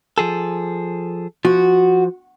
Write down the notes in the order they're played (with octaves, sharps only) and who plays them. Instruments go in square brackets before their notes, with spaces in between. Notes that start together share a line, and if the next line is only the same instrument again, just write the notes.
[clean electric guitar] F3 G#4 A4
[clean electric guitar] F3 [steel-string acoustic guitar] F#4